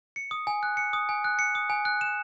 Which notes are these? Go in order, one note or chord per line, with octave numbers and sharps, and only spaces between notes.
C#7
D#6
G#5
F#6
C#7
D#6
G#5
F#6
C#7
D#6
G#5
F#6
E7